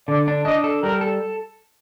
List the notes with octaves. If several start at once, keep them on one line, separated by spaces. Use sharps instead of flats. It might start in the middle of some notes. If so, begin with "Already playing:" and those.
D3 D5
D4
D4 D#5
A4
G3 A#4
A4